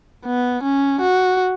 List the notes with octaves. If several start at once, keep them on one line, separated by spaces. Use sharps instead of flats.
B3
C#4
F#4